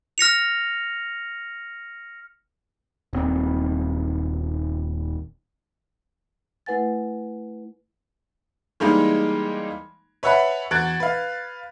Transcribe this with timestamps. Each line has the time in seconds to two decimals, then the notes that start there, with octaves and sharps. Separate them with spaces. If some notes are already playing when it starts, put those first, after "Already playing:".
0.18 F6 A#6 C#7 F7
3.13 D#1 C4
6.66 A3 E4 B4 F#5 G#5 A6
8.80 E3 G3 G#3 A#3 D#4
10.23 B4 C#5 E5 F#5 A5 B5
10.71 E2 F#4 F#6 G#6 A6 D7
11.00 B4 F5